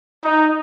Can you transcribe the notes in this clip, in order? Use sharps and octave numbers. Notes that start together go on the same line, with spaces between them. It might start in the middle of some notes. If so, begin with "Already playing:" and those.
D#4